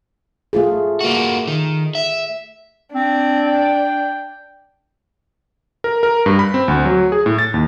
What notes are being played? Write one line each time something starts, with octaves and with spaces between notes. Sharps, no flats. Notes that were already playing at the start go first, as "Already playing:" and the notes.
A3 F4 G#4
A#3 F#4
D#3
E5
C4 D4
G5
A#4
A#4
G2
B5
C4
D2
F#3
G#4
A2
A6
D#2